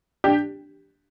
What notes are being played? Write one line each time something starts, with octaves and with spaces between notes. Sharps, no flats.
D4 G4